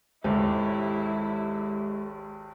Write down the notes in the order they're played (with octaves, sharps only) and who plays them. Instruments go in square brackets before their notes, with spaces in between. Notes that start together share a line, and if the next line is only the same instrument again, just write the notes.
[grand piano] G#1 D#2 [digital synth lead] G#3 [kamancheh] E4 [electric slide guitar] G4 A4 C#5